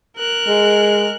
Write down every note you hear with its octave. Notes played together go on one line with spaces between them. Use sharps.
A#4 F#6
G#3